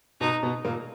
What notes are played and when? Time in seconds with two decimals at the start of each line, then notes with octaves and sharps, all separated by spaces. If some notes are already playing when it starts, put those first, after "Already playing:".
0.21 B2 B3 D#4
0.43 B2 B3
0.65 A#2 A#3